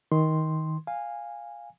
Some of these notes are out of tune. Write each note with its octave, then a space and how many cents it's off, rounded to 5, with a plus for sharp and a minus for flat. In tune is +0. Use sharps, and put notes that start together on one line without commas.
D#3 +15 C6 +0
F5 +0 G#5 -15